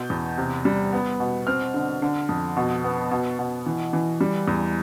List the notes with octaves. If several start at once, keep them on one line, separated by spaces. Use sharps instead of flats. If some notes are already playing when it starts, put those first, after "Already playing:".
Already playing: B2 G6
E2
C3
G3
B3
B2
C4 F6
D3
D3
F2
B2
B3
B2
B2
E3
E3
G3
E2